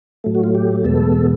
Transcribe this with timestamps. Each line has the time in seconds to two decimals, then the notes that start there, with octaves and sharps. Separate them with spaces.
0.24 A2 F#3 A3
0.35 F#4
0.44 F4
0.55 G4
0.84 E2 B2 G#3 B3 A4